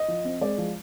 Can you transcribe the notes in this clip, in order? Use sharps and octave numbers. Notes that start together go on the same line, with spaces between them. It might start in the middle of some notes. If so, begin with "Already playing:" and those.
Already playing: D#5
F3
C4
G#3 D5
F3